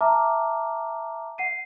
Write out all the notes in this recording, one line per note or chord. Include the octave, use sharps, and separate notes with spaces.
E5 A5 A#5 D6 F6
F#5 C7 D#7